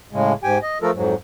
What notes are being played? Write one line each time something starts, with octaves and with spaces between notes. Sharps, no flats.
A2 C#3 G#3
G#2 G4 G5 G#5
D#5
F3 A3 F4 A4 A#4
F2 G#2 F#3